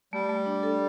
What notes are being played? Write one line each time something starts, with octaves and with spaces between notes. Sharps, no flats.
G3 A3
A3
D4
A4